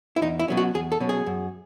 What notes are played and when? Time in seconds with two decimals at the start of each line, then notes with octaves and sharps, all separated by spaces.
0.16 E4
0.22 E2 D#4
0.39 E4
0.48 B2 F#3 C#4
0.57 F#4
0.74 E2 G#4
0.92 A4
1.00 B2 F#3 C#4
1.09 G#4
1.26 F#2